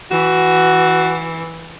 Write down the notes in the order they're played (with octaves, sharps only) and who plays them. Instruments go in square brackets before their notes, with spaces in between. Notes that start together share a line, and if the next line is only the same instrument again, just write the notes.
[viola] E3 [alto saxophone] F#4